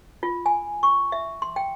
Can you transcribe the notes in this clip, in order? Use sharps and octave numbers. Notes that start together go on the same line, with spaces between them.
F4
G#5
C#6
E5
C6
G5